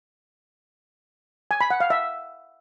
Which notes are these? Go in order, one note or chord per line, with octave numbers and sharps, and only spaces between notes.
G#5
B5
F#5
F5
E5